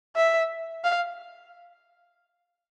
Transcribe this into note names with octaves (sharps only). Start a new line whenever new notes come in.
E5
F5